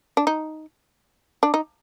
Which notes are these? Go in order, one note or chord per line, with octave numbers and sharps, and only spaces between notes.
D4
D#4
D4
D#4